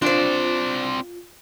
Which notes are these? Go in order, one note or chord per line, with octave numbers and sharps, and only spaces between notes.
C4 D4 F4 C5 D5